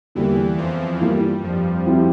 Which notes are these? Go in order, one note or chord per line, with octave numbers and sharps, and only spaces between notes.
E2 D3 E3 G3 A#3
F2 F3
G2 E3 G3 A#3 F4 A#4
F2 F3
F3 C4 E4 G4